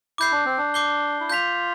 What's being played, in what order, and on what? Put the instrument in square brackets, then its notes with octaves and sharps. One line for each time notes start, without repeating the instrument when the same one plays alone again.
[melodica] E4 [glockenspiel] D6 G6 C7
[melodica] D4
C4
D4
[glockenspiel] D6 G6 C7 G7
[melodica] E4
[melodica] F4 [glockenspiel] G6 B6 F7